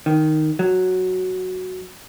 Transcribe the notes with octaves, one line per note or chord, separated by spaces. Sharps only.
D#3
F#3